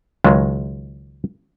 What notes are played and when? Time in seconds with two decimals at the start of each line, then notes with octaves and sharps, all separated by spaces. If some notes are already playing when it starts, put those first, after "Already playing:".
0.24 C#2 D#3 F#3 G#3